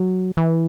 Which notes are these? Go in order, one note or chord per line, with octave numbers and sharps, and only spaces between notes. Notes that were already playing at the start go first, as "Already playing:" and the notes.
Already playing: F#3
E3